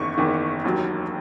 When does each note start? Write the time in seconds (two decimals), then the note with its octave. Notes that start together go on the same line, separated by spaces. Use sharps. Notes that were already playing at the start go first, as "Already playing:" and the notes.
Already playing: F#1 E2 D#3 C#6
0.18 F#1 E2 D#3
0.64 E1 D#2 D#3 F#3